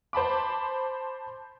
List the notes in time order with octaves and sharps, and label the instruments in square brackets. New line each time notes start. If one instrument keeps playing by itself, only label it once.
[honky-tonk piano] C5 A5 B5 D6